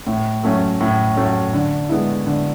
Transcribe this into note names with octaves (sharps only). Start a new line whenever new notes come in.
A2
F#3 A3 C#4
A2
F#3 A3 C#4
D3
G#3 B3 E4
D3